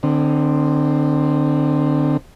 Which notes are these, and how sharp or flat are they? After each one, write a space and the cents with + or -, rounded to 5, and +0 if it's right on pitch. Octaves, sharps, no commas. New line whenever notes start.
D3 +30 C4 +0